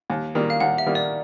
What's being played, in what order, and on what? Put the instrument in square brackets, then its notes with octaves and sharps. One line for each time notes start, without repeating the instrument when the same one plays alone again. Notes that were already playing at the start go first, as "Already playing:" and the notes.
[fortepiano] D#2
D#3 G3 A#3
[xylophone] F5
[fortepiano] D#2 [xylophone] F#5
[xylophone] E5
[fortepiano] D#3 G3 A#3
[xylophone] D5